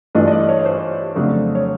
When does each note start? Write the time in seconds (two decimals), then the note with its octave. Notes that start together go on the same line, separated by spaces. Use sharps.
0.15 G2 E3 A3 D4 F4 D#5
0.28 D#5
0.32 D5
0.49 C#5
0.59 C#5
0.65 C5
1.16 F2 C#3 F#3 A3 D4
1.55 C#5